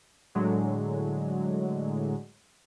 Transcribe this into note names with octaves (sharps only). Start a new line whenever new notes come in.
A2 D3 F#3 G#3